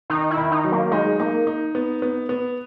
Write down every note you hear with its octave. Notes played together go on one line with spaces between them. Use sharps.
D#3 D#4
E4
D#3
D#4
F#3
A#3
G#3 D#4
A#3 D#4
D#4
B3
B3
B3